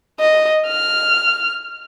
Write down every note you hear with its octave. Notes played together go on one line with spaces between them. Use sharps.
D#5
F6